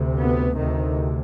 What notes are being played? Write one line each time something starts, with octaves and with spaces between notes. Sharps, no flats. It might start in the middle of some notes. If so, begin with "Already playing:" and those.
Already playing: D2 C3
B3
D2 C3 D#3